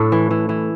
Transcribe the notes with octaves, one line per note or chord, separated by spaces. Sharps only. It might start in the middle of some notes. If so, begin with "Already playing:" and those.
Already playing: A2 D4 A4
E3
E3
E3